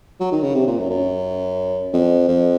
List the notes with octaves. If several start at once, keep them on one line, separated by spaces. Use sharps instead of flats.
F#3
D#3
C#3
C3
A#2
F#2
F#2
F2
F2